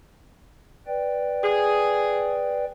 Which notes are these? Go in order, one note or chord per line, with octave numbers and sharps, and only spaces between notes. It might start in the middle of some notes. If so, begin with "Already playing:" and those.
B4 D5 G5
G#4